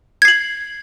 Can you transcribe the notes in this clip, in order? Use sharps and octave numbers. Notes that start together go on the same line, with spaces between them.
G#6 C7 F#7